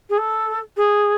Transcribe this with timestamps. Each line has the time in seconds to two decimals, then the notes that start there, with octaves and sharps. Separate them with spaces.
0.10 G#4
0.18 A4
0.77 G#4